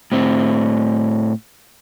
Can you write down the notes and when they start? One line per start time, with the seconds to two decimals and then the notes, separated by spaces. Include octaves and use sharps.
0.12 A2 C4